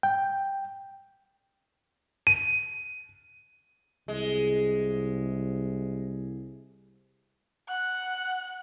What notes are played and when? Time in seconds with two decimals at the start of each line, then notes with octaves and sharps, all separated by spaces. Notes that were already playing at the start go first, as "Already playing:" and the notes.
0.03 G5
2.27 D#7
4.08 C2 G#3
7.69 F#5 F#6